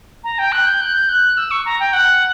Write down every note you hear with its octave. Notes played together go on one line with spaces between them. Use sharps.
A#5
G5
F#6
G6
F#6
G6
F#6
E6
C#6
A#5
G5
F#5